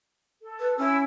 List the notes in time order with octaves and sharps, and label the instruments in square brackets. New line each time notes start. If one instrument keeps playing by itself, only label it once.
[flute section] A4
[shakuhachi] B4
[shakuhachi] C#4 [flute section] E4 E6